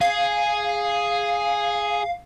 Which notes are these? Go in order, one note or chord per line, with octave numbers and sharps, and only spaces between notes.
G#4 F5